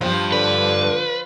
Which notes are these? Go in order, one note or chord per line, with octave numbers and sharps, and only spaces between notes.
E2 G2 F3
D3 B4